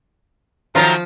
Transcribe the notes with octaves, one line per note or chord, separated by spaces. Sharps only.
D#3 F3 F#3 A3 F4 A#5